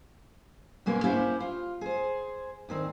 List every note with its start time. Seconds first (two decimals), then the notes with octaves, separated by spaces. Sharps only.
0.86 B2 G#3 A#3 B3 C#4
1.04 A#3 C#4 E4 G4 C5 E5
1.40 F4
1.81 G#4 C5
2.69 D2 D#3 C4